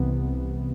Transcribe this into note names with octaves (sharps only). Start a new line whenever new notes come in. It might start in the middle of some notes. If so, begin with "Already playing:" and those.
Already playing: C2 C3 E3 B3